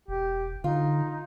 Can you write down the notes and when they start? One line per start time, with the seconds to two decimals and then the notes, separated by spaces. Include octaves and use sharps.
0.08 E1 G4
0.64 D3 D#4 F4